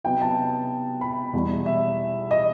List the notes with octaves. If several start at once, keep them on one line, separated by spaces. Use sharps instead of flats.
C3 F#3 B3 D#4 G5
A5
B5
E2 B2 G3 D#4
E5
D#5